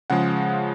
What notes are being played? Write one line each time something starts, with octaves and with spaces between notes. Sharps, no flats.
C#3 F3 G#3 F#5